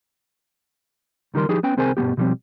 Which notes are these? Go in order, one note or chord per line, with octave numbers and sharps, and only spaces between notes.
C#2 D#3 G3 A#4 C6
F3 D#4 G4 G#4
B3 C#4 G5
C2 C4 G#4 A#4 C5 G#5
G2 B2 F#3 B3 G4
B2 F3 G3 A3 C4